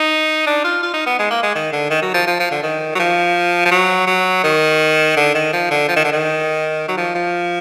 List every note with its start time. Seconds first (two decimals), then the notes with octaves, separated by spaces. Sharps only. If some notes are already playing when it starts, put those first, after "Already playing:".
Already playing: D#4
0.47 D4
0.65 F4
0.83 F4
0.94 D#4
1.07 B3
1.19 G#3
1.31 A#3
1.43 G#3
1.55 D#3
1.73 D3
1.91 D#3
2.02 F#3
2.14 F3
2.27 F3
2.40 F3
2.51 D3
2.63 D#3
2.95 F#3
3.00 F3
3.66 F3
3.71 F#3
4.07 F#3
4.44 D#3
5.17 D3
5.35 D#3
5.53 F3
5.71 D3
5.88 F3
5.96 D#3
6.04 D3
6.12 D#3
6.88 F#3
6.97 F3
7.15 F3